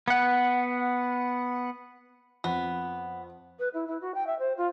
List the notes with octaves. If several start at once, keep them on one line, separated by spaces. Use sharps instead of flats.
B3 F#5
F2 B3
B4
E4
E4
F#4
G5
E5
C5
F4